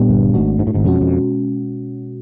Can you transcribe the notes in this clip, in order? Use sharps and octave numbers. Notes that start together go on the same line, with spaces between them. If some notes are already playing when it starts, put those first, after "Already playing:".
Already playing: A#2 G3 B3 D4 G4
G1 G2
G#1 G#2 A3 D4 F#4
G#2
A2
G#1 G#2
F2 B2 G#3 C#4 F#4
F2